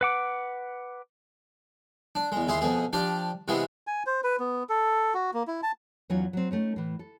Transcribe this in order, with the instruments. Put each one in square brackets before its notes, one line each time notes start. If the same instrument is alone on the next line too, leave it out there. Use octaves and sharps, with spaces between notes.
[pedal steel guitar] B4 F#5 D6
[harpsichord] D4
E2 G#3
D#2 E4 G#4 C6
F2 B2 G#4
F3 D4 G4 D5
C3 E3 G#3 B3 G#4
[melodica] G#5
C5
B4
B3
A4
F#4
A#3
E4
A5
[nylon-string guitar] E2 F#3 C#4 D#4 F4 G#5
F#3 C4
A3 C#4 D#4
A2 E3
A4